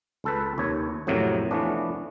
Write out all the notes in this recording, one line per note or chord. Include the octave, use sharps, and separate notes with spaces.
C#2 A4 B4
D#2 C3 C#5
F2 A2 C3 F#3 A#3
E3 F3 A3 B3 C#4 D4